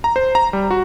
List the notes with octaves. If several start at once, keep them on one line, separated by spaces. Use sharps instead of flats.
A#5
C5
A#5
G3
F#4